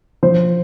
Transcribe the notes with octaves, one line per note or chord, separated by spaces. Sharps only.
F3 C5